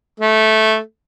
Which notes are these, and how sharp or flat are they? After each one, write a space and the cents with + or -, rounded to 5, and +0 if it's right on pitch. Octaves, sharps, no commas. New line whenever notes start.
A3 -10